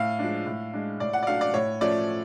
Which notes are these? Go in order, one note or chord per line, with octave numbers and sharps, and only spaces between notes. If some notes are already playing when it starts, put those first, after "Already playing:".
Already playing: A2 F5
F3 G#3 D4
A2
G#3 D4
A2 D5
F#5
D5
F#3 A3 D4 F5
D5
A2 C#5
F3 A3 C#4 D5